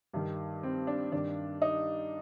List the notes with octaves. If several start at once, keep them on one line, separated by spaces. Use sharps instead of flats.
G2 D#3
C4
D4
G2 D#3 D4
D#4